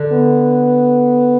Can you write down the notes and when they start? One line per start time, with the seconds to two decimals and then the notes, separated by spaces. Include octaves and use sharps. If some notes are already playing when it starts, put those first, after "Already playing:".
Already playing: D3
0.13 B3